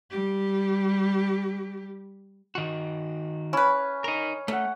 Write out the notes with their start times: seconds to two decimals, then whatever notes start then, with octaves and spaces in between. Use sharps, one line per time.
0.11 G3 G4
2.55 D#3 F#4
3.53 C#4 E4 B4
4.04 D#4 A#4
4.48 A3 C#4 F#5 A#5